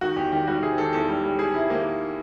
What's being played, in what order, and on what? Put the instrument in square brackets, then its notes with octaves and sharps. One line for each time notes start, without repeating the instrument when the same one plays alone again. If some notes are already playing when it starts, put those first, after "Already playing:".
[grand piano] D#3 F#4
E2 G4
D#3 G4
G3 F#4
C3 G#4
D#3 A4
E2 A4
G3
G3
G3 G#4
C3 E4
D#3 A#3